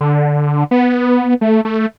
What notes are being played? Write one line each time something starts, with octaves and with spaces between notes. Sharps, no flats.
D3
B3
A3
A3